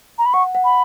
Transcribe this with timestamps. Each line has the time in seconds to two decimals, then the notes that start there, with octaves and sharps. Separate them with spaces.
0.19 A#5
0.26 B5
0.34 F#5 C#6
0.55 F#5
0.64 B5